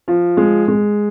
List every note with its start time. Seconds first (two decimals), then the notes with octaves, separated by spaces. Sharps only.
0.08 F3
0.37 G#3
0.68 G#3